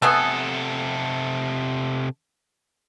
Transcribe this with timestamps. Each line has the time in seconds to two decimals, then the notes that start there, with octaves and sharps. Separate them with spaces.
0.02 C3 A3 B3 G#4 A4